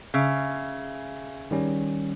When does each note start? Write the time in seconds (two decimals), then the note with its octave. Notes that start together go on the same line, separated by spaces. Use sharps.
0.14 C#3 E5 F5
1.51 D#3 G3 C#4